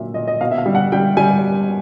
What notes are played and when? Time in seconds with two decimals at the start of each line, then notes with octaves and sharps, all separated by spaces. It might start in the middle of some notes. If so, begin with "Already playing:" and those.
Already playing: A#2 F#3 E5
0.14 A#2 D#5
0.28 D#5
0.41 B2 F5
0.51 E5
0.58 F5
0.66 G3
0.75 F#5
0.92 G3 G5
1.17 G3 G#5